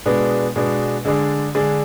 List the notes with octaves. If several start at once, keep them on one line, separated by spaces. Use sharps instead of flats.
B2 G#3 B3 D4
B2 G#3 B3 D4
D3 G#3 D4 G#4 D5
D3 G#3 D4 G#4 D5